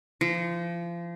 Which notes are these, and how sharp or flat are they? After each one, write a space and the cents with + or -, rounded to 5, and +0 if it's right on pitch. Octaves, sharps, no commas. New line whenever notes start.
F3 -30